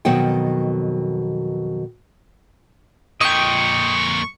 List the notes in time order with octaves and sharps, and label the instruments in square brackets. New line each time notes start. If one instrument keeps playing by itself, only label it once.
[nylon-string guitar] F2 B2 D#3 F#3 F#5 G5
[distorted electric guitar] F2 A#2 [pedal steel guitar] D#5 G5 [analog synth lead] C#6